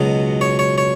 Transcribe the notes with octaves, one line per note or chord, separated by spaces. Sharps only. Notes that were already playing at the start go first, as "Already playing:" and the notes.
Already playing: C#2 B2 F#3 D#5
C#5
C#5
C#5